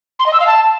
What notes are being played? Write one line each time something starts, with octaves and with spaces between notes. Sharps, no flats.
C6
D#5
E6
F5
A5